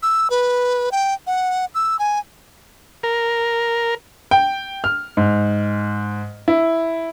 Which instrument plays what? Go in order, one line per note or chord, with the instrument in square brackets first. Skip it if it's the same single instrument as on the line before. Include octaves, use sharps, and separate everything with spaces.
[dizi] E6
B4
G5
F#5
E6
G#5
[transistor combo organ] A#4
[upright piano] G5
F6
G#2
E4